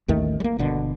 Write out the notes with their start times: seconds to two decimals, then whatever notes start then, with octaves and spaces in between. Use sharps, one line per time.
0.08 A1 D#2 D#3 A3
0.40 G3 A#3
0.59 G1 B2 D3